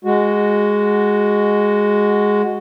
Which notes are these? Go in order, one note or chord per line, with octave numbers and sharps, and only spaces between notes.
G#3 F#4